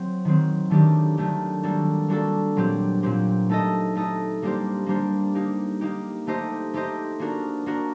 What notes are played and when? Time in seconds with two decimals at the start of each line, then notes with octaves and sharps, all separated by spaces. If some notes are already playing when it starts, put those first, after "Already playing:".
Already playing: F#3 C4
0.25 D#3 F#3 C4
0.70 D#3 F#3 A3 D4 G4
1.18 D#3 F#3 A3 D4 G4
1.63 G3 A#3 D4 F#4 A4
2.08 G3 A#3 D4 F#4 A4
2.56 A#2 F#3 C4 G4
3.03 A#2 F#3 C4 G4
3.49 A3 D#4 A4 D#5
3.95 A3 D#4 A4 D#5
4.42 G3 A#3 D4 G4 C5
4.86 G3 A#3 D4 G4 C5
5.35 A#3 D#4 G4
5.81 A#3 D#4 G4
6.27 A3 D#4 G4 C5 D#5
6.74 A3 D#4 G4 C5 D#5
7.20 A#3 D4 F#4 A#4
7.66 A#3 D4 F#4 A#4